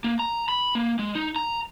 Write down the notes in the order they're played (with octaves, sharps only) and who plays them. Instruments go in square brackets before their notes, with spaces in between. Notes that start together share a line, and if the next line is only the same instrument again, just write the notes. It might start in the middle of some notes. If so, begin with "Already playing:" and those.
[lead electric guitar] A#3
A#5
B5
A#3
G#3
D#4
A#5